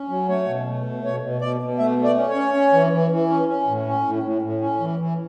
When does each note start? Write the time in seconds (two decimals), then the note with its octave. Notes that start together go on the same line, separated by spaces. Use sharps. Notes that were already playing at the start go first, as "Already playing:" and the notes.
Already playing: C#4
0.09 F#3
0.29 A3 C#5
0.47 B2
0.66 A3
0.85 B2
1.05 B2 C#5
1.22 B2
1.41 B2 D5
1.61 B2
1.79 A3 E5
1.98 A3
2.04 D5
2.17 C#4
2.30 C#5
2.35 C#4
2.54 C#4
2.73 E3
2.92 E3
3.11 E3
3.29 C#4
3.48 C#4
3.67 A2
3.86 C#4
4.05 A2
4.23 A2
4.42 A2
4.61 C#4
4.80 E3
4.99 E3